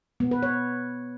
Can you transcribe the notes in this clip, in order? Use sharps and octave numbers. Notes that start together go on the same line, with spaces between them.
B3
B4
C#5